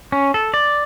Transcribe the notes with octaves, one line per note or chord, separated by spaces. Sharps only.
C#4
A4
D5